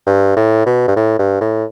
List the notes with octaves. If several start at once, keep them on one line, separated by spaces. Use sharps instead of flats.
G2
A2
B2
G2
A2
G2
A2